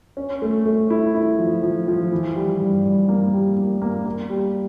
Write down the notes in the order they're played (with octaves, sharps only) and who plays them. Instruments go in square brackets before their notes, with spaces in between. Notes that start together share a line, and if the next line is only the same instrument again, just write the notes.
[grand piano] C#4
A3
A3
E4
E4
F3
F3
F3
E3
G3
G2
G2
A#3
G3
A#3
A#3
A#3
G3